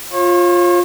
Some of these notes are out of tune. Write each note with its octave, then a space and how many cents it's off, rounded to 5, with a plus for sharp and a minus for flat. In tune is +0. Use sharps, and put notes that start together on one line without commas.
F4 +5 C#5 -40